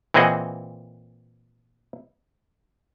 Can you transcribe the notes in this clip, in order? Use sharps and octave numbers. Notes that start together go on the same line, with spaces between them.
A#2 E3 C4 G#4 D#5 F#5